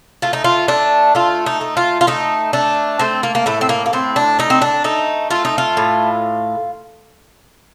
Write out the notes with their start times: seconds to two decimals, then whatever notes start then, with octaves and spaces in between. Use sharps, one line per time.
0.22 A3 F4
0.33 D#4
0.44 F4
0.68 A3 D4
1.15 A3 F4
1.46 D#4
1.61 A3
1.77 F4
2.01 F4
2.07 A3 D#4
2.53 A3 D4
2.99 A3 C4
3.23 A#3
3.35 A#3
3.46 A2 A3
3.61 C4
3.69 A#3
3.86 A#3
3.93 A2 C4
4.16 D4
4.39 A3 D#4
4.50 C4
4.62 D4
4.84 A3 D#4
5.31 A3 F4
5.45 D#4
5.58 F4
5.77 A2